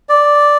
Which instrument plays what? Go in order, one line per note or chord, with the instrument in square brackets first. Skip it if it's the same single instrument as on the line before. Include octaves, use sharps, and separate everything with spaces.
[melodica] D5